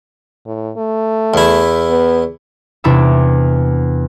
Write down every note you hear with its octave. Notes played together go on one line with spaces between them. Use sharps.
A2
A3
E2 E4
B3
E2 C3 D4 E4 D6 E6